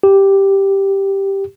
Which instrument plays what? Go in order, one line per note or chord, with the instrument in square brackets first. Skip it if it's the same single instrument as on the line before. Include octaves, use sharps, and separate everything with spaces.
[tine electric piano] G4